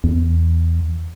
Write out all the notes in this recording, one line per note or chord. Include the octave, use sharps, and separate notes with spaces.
E2